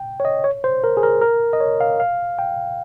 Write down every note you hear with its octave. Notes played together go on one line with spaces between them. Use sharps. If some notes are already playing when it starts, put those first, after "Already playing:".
Already playing: G5
C#5
D#5
C#5
C5
A#4
G#4
A#4
A#4
D#5
C#5
F5
F5
G5